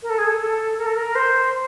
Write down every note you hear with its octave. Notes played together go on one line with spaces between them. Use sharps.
A#4
A4
G#4
A4
A4
A#4
A4
A#4
C5